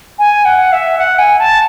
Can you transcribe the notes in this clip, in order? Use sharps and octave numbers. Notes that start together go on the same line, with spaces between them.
G#5
F#5
E5
F#5
G#5
A5